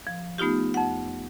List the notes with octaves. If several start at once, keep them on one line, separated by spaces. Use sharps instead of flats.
F3
A3 B3 D#4 F4 G4
F2 F#5